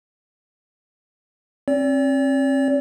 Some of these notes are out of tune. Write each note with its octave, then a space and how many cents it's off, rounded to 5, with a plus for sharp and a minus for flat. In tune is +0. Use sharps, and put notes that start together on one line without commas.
C4 +40 D5 -40